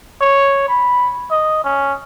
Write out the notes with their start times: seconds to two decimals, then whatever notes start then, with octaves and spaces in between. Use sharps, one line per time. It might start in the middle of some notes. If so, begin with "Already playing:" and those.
0.21 C#5
0.68 B5
1.31 D#5
1.64 C#4